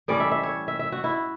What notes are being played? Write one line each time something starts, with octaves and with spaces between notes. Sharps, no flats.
A2 E3 G3 C#4 D5
E5
E5
C#5
E5
E5
F#4
E4